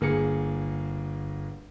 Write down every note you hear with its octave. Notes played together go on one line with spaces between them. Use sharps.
G1 A#3 G#4 C#7